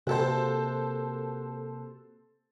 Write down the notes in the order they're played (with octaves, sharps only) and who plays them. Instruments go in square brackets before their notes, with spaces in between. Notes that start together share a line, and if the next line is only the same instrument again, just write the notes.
[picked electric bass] C3 A#3 [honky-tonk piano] F#4 A4 C5